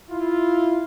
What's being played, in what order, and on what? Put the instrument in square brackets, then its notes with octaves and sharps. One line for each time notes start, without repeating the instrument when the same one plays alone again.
[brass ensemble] E4 F4